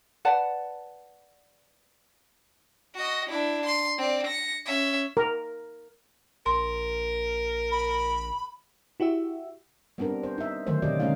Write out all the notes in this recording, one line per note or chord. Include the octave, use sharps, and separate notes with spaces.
B4 D5 F#5 A5
F#4 D#5
D4 E4
C6
C4 D5
A#6 C#7
C#4 E5
A#4
A#1 A#4 C6
B5
E4 F#4 G4 E5
G3 B3 C4 D4 A#4
C5
D#4 E5
D3 D#3 F#3 A3 C5
B2 C4 G4 D5 D#5
D3 G#3 A#3 C#4 D#4 F5